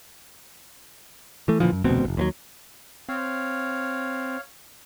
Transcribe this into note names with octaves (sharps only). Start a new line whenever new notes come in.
E3 A3
A#2 D3 E3 F3
F#2
F1 D2 B2 C4
F1 C2
D#2 E3 F#3
C4 C#5 F5